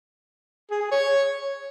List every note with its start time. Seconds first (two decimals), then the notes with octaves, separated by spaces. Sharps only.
0.71 G#4
0.81 G#4
0.92 C#5